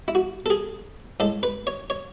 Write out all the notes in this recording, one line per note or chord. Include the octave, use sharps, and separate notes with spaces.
E4
F#4
A4
G#4
A2 G#3 A4
B4
C#5
C#5